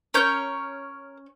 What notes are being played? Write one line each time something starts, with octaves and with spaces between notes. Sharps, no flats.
C#4 A#4 C#5 G6